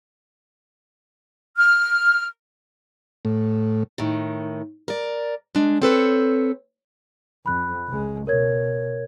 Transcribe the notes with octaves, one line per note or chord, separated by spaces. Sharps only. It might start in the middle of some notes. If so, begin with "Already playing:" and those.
F6
A2
A2 D#3
A#4 D5
G#3 D4
C4 A4 B4 C#5
F2 B5 F#6
C#2 G#3
B2 A#4 C#5 G#6